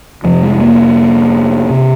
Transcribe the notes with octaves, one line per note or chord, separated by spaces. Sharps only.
F2 C3 F3
G#3
A#3
C3